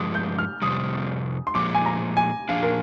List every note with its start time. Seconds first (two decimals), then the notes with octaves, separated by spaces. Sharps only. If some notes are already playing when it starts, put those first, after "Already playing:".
Already playing: G2 F3 G#3 D6 D#6
0.15 G6
0.38 F6
0.62 F2 C3 G3 D#6
1.47 C6
1.55 A#2 F3 G#3 D6
1.74 G#5
1.86 A#5
2.17 G#5
2.49 A#2 F3 A#3 D4 G#4 F5
2.63 A#4